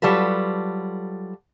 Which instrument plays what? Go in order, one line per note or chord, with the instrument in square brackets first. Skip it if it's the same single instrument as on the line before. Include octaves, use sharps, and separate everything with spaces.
[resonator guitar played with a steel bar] F#3 G3 F4 A4 B4